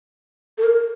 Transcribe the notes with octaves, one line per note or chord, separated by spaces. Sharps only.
A4
A#4